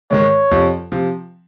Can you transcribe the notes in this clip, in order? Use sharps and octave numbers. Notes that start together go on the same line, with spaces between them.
G#2 D#3 G#3 C#5
F2 C3 F3
C3 F3